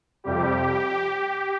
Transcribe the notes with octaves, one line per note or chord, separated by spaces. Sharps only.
F2 C3 G3 G4